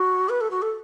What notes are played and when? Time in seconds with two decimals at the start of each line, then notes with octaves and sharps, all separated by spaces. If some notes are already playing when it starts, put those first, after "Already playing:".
Already playing: F#4
0.29 B4
0.41 A4
0.51 F#4
0.62 A4